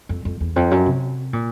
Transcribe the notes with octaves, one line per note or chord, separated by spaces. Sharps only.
F2
F2
E2
F2
F#2
C3
A#2